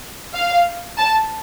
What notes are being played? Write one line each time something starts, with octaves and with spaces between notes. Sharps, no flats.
F5
A5